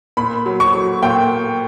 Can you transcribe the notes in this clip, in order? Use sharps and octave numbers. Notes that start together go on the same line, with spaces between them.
A#2 B5
F#3
C#6
F#3
A#2 G5